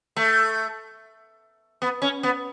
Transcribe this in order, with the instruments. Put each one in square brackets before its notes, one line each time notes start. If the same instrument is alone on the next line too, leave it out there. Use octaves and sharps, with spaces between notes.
[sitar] A3
B3
C#4
B3